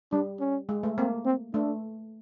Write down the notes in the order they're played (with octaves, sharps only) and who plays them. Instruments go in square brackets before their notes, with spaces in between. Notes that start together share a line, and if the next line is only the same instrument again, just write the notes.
[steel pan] G3 [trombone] D4
[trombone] C#4
[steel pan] G#3
A3
[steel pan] A#3 [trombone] C4
[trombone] C4
[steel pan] A3 [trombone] D4